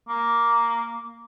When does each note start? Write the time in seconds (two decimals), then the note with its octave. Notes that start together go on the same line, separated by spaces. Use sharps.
0.09 A#3